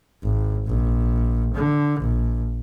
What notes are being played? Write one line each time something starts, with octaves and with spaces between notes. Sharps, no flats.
G#1
A#1
D3
A#1